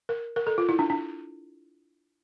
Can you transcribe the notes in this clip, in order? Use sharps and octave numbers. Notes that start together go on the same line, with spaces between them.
A#4
A#4
A4
F4
E4
D4
D4